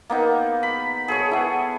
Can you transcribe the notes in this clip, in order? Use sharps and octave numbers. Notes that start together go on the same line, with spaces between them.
A#3 B3 D#4
B5
G#4 A4 C#5
B3 E4